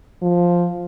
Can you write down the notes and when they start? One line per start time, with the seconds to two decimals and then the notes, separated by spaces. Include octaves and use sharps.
0.22 F3